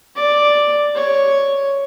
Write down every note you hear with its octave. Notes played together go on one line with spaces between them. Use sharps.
D5
C#5